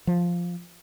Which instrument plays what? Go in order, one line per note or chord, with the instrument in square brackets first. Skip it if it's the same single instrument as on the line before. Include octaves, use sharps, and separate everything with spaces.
[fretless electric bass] F3